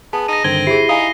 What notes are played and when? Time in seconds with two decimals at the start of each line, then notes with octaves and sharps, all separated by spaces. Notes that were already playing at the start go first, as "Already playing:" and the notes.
0.13 B3 G#4 A5
0.28 D#4 A#6 D#7
0.44 G2 D3 D#3 C4 G#6 G7
0.67 E4 G4 G#4 C7
0.89 D#4 F5 G#5